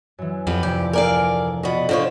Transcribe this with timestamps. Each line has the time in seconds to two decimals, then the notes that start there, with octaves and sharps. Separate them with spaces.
0.18 F#2 E3
0.47 F2 B3 G4
0.63 D2 C3 E3 G4
0.93 A4 A#4 D5 F5 G#5
1.63 B2 B3 F4 D5 D#5
1.89 D3 F3 C#5